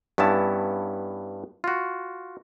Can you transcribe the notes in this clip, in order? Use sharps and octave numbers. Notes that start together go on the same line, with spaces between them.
G2 B3 C#4 E4 A5
F4 F#4